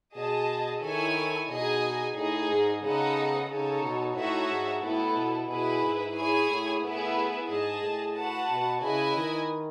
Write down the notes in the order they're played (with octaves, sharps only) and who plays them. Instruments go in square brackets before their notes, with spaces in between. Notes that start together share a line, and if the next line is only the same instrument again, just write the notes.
[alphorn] B2 [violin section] G#4 D#5 A5
[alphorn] D#3 [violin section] E4 A4 C#5 G#5
[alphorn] B2 [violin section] D#4 G#4 D#5 G#5
[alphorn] A2 [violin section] D#4 G#4 D#5
[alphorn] G#2
[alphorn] C#3 [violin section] B3 D#4 A4 D#5 F#5
[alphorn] C#3 [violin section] D#4 A4 C#5
[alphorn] B2
[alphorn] A2 [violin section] D#4 F#4 C#5 E5 A5
[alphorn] G#2
[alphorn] A2 [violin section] B3 E4 A4
[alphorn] B2
[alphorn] B2 [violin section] E4 G#4 B4
[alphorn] G#2
[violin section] E4 G#4 C#5 G#5
[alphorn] A2
[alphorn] A2 [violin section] B3 E4 G#4 B4 E5
[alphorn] G#2 [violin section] G#4 D#5 A5
[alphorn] A2
[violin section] F#4 B4 F#5 A5
[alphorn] B2
[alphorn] C#3 [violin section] E4 B4 D#5 G#5
[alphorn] D#3